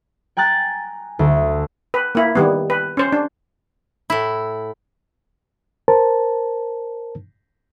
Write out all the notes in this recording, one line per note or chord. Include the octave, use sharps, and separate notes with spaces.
G5 G#5 A#5 F#6 A6
D2
B4
A#3 E4
D#3 G3 B3
B4
C#4 C5
D4
A2 E4
A#4 C5 A5